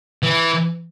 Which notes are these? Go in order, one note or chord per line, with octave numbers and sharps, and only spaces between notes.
E3